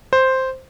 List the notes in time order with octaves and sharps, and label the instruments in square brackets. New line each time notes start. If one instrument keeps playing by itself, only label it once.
[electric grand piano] C5